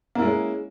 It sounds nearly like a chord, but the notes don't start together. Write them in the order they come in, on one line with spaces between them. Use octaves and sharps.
A#3 E4 G#3 C#4